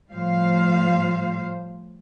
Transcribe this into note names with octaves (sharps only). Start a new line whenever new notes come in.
A2 F3 G3 C5 F5